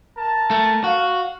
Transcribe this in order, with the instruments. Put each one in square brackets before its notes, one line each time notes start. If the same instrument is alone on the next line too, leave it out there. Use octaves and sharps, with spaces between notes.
[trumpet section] A#4 A5
[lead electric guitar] A3
[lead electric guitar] F#4 [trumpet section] F5